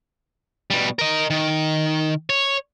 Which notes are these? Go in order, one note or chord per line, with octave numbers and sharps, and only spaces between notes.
B2 G3
A#4 D#5
D#3
C#5